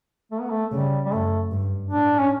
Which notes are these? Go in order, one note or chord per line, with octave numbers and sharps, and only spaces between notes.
A3
B3
A3
C#3 G3
G3
F#2 A3
G2
A2 D4
C#4